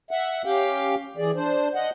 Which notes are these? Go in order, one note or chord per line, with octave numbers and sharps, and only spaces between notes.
E5 F#5
C#4 G4 F5 G5
E3 G#4 D5
D4 C5
D#5 F#5